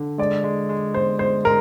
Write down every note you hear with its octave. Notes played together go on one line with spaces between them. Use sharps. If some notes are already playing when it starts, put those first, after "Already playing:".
Already playing: D3
G#3 D5
G#3
G#3
G#3 C5
G#3 C5
G#3 A#4